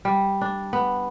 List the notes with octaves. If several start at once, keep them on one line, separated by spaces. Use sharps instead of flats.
G3
D4
B3